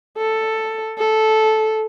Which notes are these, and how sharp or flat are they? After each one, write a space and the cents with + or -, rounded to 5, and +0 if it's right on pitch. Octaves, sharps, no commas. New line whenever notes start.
A4 +5
A4 -10